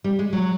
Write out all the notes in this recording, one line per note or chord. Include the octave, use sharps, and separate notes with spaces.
G3
G#3
F#3